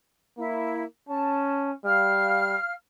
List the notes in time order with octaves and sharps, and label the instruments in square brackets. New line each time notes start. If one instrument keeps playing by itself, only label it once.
[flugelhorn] A#3 [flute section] E4
[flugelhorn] C#4 [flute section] A5
[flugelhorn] G3 [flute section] F5 F6